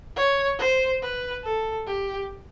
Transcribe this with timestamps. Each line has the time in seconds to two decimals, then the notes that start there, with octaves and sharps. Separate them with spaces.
0.16 C#5
0.58 C5
1.02 B4
1.44 A4
1.87 G4